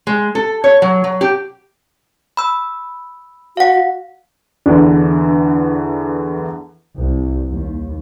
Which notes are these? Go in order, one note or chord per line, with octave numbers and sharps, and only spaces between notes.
G#3
A4
C#5
F#3
F#3
G4
B5 E6
F#4 F5 F#5
E2 D3 E3 D4
C2
D#2